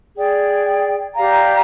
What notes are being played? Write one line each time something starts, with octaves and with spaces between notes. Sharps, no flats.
G#4 D5 G5
G4 D5 F5 A#5